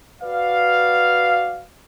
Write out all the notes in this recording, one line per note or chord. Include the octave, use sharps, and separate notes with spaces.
F#4 B4 D5 F5